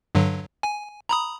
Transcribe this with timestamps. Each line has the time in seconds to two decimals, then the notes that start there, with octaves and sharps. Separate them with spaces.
0.15 G2 D3 F#3
0.63 G#5
1.09 A#5 B5 D#6